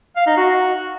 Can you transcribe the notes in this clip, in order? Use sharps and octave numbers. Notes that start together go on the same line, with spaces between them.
F5
D#4
F#4